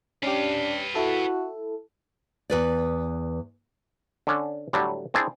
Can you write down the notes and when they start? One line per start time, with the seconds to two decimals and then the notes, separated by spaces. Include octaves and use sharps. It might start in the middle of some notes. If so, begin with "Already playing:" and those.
0.23 C#4 D4 G4 B4 F5
0.95 E4 F#4 A4
2.50 E2 B4 D5
4.27 D3 C#4 D4
4.73 A2 D3 F#3 G3
5.14 C4 D4 E4 G#4 D5